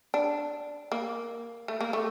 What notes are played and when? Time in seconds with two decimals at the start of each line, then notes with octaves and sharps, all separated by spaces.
0.14 D4
0.92 A#3
1.68 A3
1.81 A#3
1.93 A3